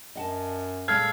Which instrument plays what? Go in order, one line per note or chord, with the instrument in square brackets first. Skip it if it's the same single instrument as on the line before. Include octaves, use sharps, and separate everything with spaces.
[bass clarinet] F#2 [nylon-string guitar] D#5 F#5 A5
[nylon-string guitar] A#2 G#3 [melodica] A4 F5 [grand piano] F6 G#6